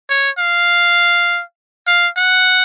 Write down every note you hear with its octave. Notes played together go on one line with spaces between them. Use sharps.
C#5
F5
F5
F#5